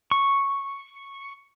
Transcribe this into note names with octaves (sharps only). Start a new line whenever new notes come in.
C#6